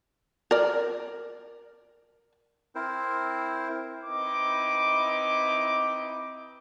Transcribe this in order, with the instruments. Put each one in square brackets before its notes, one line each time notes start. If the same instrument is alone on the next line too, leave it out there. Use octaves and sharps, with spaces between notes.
[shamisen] A#4 D5
[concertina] C4 E4 A#4 C5
[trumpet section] C4 D#4 E4 B4 D#5 D6